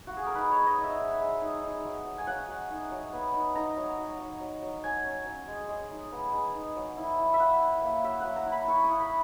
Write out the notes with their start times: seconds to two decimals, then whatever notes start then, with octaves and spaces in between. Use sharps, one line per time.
0.07 F#4
0.17 G#4
0.26 A#4
0.35 D#4 B4
0.51 C#5
0.57 G#3
0.67 D#5
0.78 D#4
0.84 E5
0.99 G#3
1.20 G#3
1.42 D#4
1.63 D#4
1.85 F#3
2.06 F#3
2.18 G#5
2.27 F#3 F#5
2.48 F#3
2.70 D#4
2.91 F#3
3.13 B3
3.34 D#4
3.55 D#4 A#5
3.77 F#3
3.98 F#3
4.20 F#3
4.41 F#3
4.63 F#3
4.83 F#3 G#5
5.05 C#4
5.26 F#3
5.48 G#3
5.69 G#3
5.90 D#4
6.12 B3
6.33 G#3
6.55 D#4
6.76 F#3
6.97 E4
7.18 E4
7.34 E5
7.40 F#3 F#5
7.61 E4
7.82 A#3
8.04 F#3 E5
8.20 F#3 F#5
8.36 A#5
8.46 E4
8.52 B5
8.68 E4 C#6
8.84 D#6
8.89 E4
9.00 B5